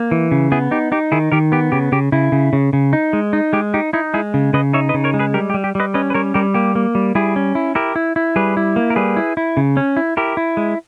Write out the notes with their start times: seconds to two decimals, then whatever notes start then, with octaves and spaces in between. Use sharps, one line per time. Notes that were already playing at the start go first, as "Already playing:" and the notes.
Already playing: A#3
0.11 E3
0.32 C#3
0.52 B3 E4 G#4
0.71 D#4 G4
0.92 D#4 G4
1.12 D#3 E4 G#4
1.32 D#3 G4 A#4
1.52 B3 G4
1.72 C#3 G4
1.92 C#3 G4
2.12 C#3 E4
2.32 C#3
2.53 C#3
2.73 C#3
2.93 D#4
3.13 G#3
3.33 D#4
3.53 G#3 G4
3.74 D#4 G4
3.93 D#4 E4
4.14 G#3 E4 G#4
4.34 C#3
4.53 C#3 B4 D#5
4.73 D#4 C#5 E5
4.89 B4 D#5
4.94 C#3
5.04 A#4 C#5
5.14 G#3
5.19 G#4 B4
5.34 G3 G4 A#4
5.50 G4
5.54 G3
5.64 G4
5.75 G3 B4 D#5
5.94 C#4 B4 D#5
6.10 B4
6.14 G3 A#4 C#5
6.34 G3 G4 A#4
6.54 A#3 G4
6.75 A#3
6.95 G3
7.15 G3 E4 G#4
7.36 C#4
7.55 E4
7.75 E4 G4 A#4
7.96 E4
8.16 E4
8.36 G3 G#4 B4
8.57 E4
8.76 A#3
8.90 A#4
8.96 G3 G#4 B4
9.17 E4
9.37 E4
9.57 C#3
9.77 C#4
9.97 E4
10.17 E4 G4 A#4
10.37 E4
10.57 G#3